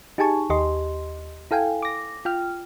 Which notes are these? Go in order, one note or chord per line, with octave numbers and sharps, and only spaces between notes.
D#4 G4 G#4 G#5 A5 C#6
D#2 G4 D#5 C6
E4 A4 F5 G5 G#5
D6 A#6
F4 G5 F6